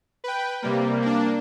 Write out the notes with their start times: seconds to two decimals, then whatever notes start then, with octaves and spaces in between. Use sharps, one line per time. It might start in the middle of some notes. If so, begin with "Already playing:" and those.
0.24 B4 G5
0.62 C3 G3 A#3
1.02 A#3 D4